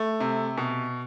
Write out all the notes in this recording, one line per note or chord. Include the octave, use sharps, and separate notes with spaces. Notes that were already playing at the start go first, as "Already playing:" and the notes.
Already playing: A3
C3
B2